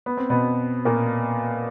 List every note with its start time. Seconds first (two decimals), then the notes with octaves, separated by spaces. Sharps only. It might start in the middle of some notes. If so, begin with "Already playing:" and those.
0.06 B3
0.17 C4
0.30 B2 B3
0.85 A#2 A#3